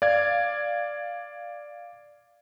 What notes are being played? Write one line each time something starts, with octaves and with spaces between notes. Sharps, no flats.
D5 F5 G#6